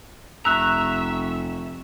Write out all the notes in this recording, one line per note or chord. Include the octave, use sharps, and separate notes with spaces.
F1 E5 A#5 C#6 E6 F#6